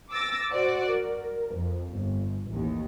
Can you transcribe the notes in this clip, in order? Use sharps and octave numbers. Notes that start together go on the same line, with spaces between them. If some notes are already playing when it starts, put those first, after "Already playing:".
D6 E6 A6 A#6
F#4 C5 D5
A#4
F2
G1
A1 D#2